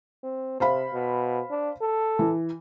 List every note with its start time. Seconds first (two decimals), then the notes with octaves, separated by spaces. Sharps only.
0.23 C4
0.60 C3 C5 F5 B5
0.93 B2
1.50 D4
1.81 A4
2.19 E3